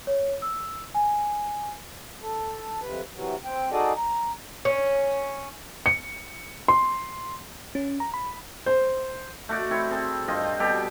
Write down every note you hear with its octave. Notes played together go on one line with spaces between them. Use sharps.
C#5
E6
G#5
A4
F2 C3 B4
C3 E3 F#3
C4 G5
D#4 F#4 G#4 A4 D5 D#5
A#5
C#4
C#7
C6
C#4
A#5
B5
C5
A3 F#4 D5
C4 E4 C#5
C4 G#4 A4
G2 C4 F4 D#5
G2 B2 G4 A4